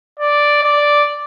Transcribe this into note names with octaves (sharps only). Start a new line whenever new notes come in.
D5
D5